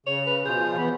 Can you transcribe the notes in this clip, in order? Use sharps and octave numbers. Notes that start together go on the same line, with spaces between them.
C#3 C#5 F7
B4
B2 F3 F4 G#4 G6
E3 B3 B5